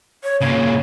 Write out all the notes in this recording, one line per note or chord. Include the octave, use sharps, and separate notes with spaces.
C#5
A#2 C#3 C#5